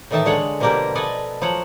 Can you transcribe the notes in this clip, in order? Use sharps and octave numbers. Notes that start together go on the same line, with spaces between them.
A2 D#3 E3 D#4 E5 A5
D3 G#3 C#5 F#5
B2 F3 G3 A#3 G4 A#4
A4 B4 D5 D#5 G#5
F3 F#3 C#5 F#5